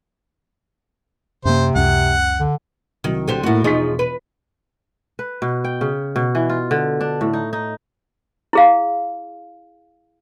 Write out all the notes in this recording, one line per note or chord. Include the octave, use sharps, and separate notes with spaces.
F#2 C3 A#3 C5
C#2 F#2 F#5
D3
C2 D#3 F#3
D3 G4 C5
A2 A3 A#3 E4 F#4
E1 F3 D#4 G#4 C#6 B6
B4
B4
B2
G5
C#3
B2
E3
F4
D3
D4
A2
D#4
D#4
E4 G#4 F5